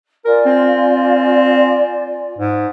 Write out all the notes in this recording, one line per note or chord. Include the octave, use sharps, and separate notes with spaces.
F4 A#4 D5 G#5
C4
G#2